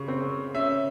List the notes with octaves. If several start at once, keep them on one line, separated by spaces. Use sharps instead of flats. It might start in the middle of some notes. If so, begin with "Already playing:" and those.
Already playing: C#3 C#6
C4
C#4 E5